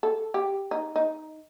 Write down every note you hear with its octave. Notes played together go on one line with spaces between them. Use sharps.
A4
G4
D#4
D#4